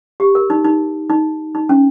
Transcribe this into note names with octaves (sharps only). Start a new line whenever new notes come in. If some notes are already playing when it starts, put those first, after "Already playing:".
G4
A#4
D#4
D#4
D#4
D#4
C#4